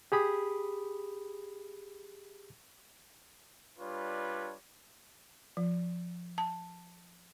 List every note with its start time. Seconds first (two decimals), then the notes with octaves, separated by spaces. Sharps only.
0.12 G4 G#4 B5 D#6
3.79 G3 D4 F4 B4 C#5
5.57 F3
6.38 A5